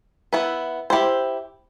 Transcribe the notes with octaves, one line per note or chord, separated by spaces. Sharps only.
B3 E4 B4
E4 G4 C5